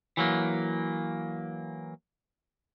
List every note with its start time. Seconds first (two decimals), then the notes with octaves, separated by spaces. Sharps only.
0.17 E3 F#3 A#3